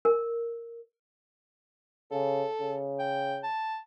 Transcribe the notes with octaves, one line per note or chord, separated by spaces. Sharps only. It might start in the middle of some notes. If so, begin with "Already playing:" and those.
A#4
C#3 A4
C#3
G5
A5